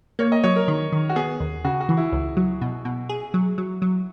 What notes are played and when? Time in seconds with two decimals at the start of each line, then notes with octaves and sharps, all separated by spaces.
0.19 A#3 C#5
0.32 D#5
0.44 F#3 C#5
0.56 A#4
0.68 D#3
0.92 D#3
1.09 F#4
1.16 B3 G#4
1.40 D#2
1.64 C#3 F#4
1.81 F#4
1.89 E3
1.97 E4
2.12 C#2
2.37 F#3
2.61 B2
2.85 B2
3.09 G#4
3.34 F#3
3.58 F#3
3.82 F#3